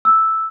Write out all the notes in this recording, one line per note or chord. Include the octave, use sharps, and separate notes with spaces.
E6